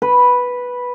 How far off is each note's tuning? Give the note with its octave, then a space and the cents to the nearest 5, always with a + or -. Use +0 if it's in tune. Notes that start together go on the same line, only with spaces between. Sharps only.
B4 -5